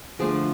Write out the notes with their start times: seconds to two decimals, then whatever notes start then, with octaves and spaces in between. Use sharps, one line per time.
0.19 D3 F3 A3 G#4